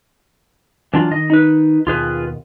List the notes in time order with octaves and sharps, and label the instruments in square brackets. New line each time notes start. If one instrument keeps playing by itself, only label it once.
[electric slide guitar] E3 D4 F4 [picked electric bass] F#3
[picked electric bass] D#3 [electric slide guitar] D#5
[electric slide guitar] D#4 B4
[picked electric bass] D#2 B2 [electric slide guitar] F4 G#4 B4